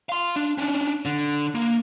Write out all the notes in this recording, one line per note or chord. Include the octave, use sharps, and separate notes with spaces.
F5 C6
D4
C#4 D4
D3
A#3